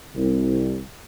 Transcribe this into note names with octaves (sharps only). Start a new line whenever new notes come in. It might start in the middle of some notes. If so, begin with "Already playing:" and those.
C2